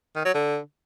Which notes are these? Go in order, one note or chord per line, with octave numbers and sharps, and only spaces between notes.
D#3
F#3
D3